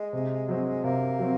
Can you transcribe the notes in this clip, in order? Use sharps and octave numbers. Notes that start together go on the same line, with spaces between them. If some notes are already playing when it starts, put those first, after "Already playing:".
Already playing: G#3
C3
F#3 C4
C3 A#3
F#3 C4